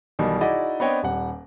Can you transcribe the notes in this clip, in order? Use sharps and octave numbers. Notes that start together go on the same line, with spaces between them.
B1 B2 D#3 E3 G3
D#4 E4 F#4 G#4 D5 D#5
B3 C4 D4 C#5 D#5 G5
D#1 G3 F#5